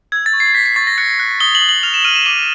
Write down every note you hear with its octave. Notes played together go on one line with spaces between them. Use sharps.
E6 G#6
A6
C#6
C7
G6 B6
C7
C#6 A6
A#6
F#6 C#7
F#6
D#6 G7
F#7
D#6
F#7
F6 F7
E7
F6 D#7
E7
D6 D#7